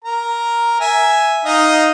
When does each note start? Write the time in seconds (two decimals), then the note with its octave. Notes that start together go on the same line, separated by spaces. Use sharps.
0.04 A#4 A#5
0.80 E5 G#5
1.45 D#4 D#5 F5